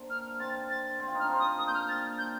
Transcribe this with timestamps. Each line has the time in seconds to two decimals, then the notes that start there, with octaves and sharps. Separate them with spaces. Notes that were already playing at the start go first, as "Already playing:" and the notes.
Already playing: A#3 C4 D4
0.10 F6
0.40 C4 A6
0.70 A6
1.00 C4
1.08 F4
1.15 D#4 F6
1.22 D4
1.29 C4
1.39 D#6
1.59 A#3 D#6
1.67 G6
1.74 F6
1.88 C4 A6
2.18 D4 G6